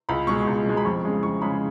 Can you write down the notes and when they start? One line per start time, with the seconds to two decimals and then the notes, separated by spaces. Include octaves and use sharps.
0.09 C#2 B5
0.27 B2 G#3 C#6
0.47 C#2
0.66 B2 G#3
0.77 B5
0.85 F2 C#6
1.05 C#3 G#3
1.23 F2 C#6
1.41 C#3 G#3 B5